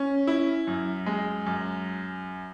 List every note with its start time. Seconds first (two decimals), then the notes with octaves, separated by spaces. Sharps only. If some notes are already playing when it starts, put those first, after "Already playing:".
Already playing: C#4
0.27 E4
0.67 F#2
1.06 G#3
1.46 F#2